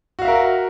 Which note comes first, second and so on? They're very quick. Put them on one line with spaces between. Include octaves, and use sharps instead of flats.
F#4 F5 E5 A#4